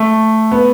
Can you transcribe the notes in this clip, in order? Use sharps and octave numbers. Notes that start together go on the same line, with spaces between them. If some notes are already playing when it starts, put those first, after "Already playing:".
Already playing: A3
B3